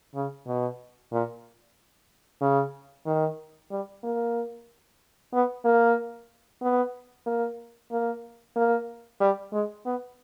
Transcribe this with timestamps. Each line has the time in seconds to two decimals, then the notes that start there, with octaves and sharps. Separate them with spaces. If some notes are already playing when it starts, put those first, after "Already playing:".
0.15 C#3
0.47 B2
1.12 A#2
2.41 C#3
3.06 D#3
3.71 G3
4.04 A#3
5.33 B3
5.65 A#3
6.62 B3
7.26 A#3
7.91 A#3
8.56 A#3
9.20 G3
9.52 G#3
9.85 B3